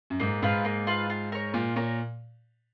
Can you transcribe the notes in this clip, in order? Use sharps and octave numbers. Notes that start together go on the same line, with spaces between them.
F#2
G#2 A#3
G#2 F4 B4 F5
A#3
F4 B4 F5
F4
A#4 C#5
A#2 F4
A#2 A#4 C#5